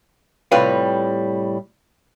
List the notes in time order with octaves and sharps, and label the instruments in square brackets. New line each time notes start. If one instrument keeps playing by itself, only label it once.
[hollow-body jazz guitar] A2 C3 G3 F4 B4 F5